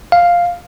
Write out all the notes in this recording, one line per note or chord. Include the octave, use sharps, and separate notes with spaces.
F5